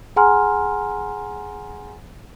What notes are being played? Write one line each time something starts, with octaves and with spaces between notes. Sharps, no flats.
G#4 F#5 G#5 A#5 C6 F6